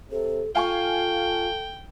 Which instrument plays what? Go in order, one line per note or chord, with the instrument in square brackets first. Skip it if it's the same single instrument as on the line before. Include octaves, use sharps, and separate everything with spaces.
[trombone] C3 [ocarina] A4
[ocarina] F4 [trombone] A4 [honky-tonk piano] F5 G#5 C#6 [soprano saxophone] G5